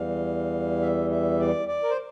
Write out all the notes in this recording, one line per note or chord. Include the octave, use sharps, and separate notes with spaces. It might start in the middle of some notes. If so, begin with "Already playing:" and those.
Already playing: E2 E3 G3 F5
E5
E5
D5
D5
A#4
C5